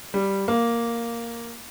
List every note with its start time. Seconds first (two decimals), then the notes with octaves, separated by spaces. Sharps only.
0.14 G3
0.48 A#3